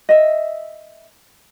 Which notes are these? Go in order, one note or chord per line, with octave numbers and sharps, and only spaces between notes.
D#5 E5